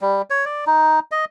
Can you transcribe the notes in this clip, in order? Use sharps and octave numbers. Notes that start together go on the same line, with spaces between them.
G3
C#5
D5
D#4
D#5